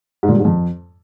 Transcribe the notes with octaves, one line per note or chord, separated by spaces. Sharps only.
G#2
A#2
G2
G#2
F2